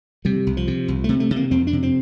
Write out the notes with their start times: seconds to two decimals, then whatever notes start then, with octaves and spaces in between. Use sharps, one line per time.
0.25 C3 G3
0.47 C2
0.57 F3
0.68 C3
0.88 C2
1.04 C3 A3
1.20 A3
1.31 C3
1.36 A#3
1.51 F2 C4
1.67 D4
1.73 C3
1.83 C4